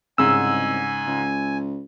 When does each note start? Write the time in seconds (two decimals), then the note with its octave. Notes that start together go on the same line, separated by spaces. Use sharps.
0.18 C2 G#2 C#3 G#5 E6
1.07 C#2